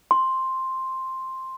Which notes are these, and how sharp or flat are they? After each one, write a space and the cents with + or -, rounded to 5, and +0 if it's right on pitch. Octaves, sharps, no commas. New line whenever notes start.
C6 +5